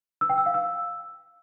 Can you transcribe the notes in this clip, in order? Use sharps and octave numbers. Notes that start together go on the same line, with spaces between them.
E6
G5
E6
F5
E6